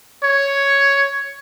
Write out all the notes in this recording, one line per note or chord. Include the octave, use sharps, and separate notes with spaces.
C#5